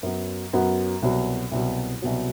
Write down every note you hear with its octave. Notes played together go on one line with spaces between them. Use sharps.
F#2 F#3 B3
F#2 F#3 B3
C2 B2 F#3
C2 B2 F#3
C2 B2 F#3